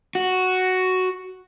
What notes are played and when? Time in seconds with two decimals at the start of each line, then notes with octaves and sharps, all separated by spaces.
0.15 F#4